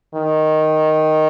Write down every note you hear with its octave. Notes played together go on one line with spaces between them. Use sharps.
D#3